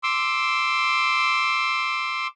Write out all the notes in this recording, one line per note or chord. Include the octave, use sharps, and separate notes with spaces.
C6 D6 E6